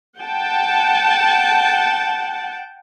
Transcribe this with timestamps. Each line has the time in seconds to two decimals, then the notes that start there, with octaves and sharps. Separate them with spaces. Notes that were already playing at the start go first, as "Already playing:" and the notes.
0.19 F#5 G5 A5